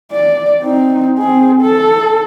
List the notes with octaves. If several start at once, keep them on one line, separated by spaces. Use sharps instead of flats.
D5
C4 D#4
C4 G#4
A4